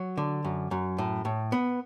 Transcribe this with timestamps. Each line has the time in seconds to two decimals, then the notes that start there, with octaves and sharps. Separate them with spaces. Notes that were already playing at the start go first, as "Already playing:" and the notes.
Already playing: F#3
0.17 D3
0.45 F#2
0.71 F#2
0.98 A2
1.25 A2
1.52 B3